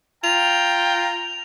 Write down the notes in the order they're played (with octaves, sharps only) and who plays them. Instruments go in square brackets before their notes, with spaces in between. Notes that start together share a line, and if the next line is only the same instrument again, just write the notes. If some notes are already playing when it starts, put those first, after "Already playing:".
[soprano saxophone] F4 [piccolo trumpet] G5 [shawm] A#5 [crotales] F7